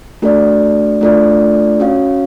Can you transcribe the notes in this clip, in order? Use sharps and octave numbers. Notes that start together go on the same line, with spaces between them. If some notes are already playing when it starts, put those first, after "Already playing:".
A3 D4 F#4 A4 D5
A3 D4 F4 A4 D5
C#4 F#4 C#5 F5